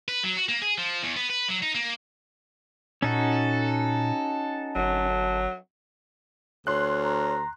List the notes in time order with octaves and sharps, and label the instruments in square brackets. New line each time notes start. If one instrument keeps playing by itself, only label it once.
[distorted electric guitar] B4
F#3
F#4
A#3
G#4
F3
E2
B3
B4
F#3
D#4
A#3
[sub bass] A#2 [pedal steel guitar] C#4 D#4 F#4 [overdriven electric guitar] A4
[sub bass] G1 [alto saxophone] F#3
[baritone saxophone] D2 [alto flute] C#5 [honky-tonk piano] C6 F#6
[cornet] A#5